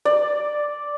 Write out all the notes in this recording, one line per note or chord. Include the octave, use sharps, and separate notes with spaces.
D5